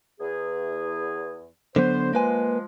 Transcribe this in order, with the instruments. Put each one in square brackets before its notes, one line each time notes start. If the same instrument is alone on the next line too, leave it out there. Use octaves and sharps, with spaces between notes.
[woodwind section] E2 G#4
[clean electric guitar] D3 F#3 B3 [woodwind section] C5
[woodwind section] F3 G#3 [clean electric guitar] A#3 B4 G#5